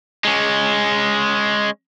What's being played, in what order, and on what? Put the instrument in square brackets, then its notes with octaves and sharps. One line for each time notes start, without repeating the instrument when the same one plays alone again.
[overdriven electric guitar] G#3 C#4